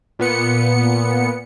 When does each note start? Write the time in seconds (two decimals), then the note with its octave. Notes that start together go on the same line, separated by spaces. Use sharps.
0.19 A#2 B3 C#7